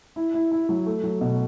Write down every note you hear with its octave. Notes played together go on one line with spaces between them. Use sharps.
E4
E4
E4
F#3
A3
F#3
B2